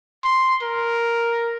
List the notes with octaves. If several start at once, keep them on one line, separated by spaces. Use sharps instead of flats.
C6
A#4